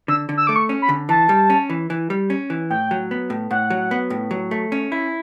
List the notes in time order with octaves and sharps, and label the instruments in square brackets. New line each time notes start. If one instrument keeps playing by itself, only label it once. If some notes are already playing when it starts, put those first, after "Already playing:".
[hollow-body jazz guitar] D3 [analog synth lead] E6
[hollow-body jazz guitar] D3
[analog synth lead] E6
[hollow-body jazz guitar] A3 [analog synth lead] D6
[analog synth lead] C#6
[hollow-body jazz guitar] C#4
[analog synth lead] B5
[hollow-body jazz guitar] D3
[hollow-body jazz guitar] E3 [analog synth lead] A5
[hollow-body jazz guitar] G3
C#4
E3
E3
G3
C#4
E3
[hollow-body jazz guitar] A2 [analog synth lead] G5
[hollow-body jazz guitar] F#3
B3
A2
[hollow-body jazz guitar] A2 [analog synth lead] F#5
[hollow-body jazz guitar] F#3
B3
A2
F#3
A3
C#4
E4